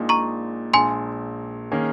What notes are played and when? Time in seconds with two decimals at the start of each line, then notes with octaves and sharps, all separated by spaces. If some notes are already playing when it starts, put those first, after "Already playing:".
Already playing: A#1 A#2 G#3 D#4
0.09 A#5 C#6
0.74 A#1 A#2 G#3 G#5 C6
1.71 D#3 A#3 C#4 G#4